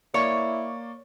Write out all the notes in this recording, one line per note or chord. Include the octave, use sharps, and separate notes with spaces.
A#3 E4 C#5 D5 C#6